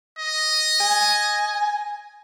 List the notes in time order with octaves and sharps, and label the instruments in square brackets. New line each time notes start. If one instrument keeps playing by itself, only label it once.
[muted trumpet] D#5
[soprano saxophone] G#5